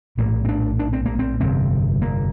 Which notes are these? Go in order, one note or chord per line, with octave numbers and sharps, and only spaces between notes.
A#1 A2 A#3
C4
D4
D4
C4
A#3
C4
G1 F2 C3 C4
A#3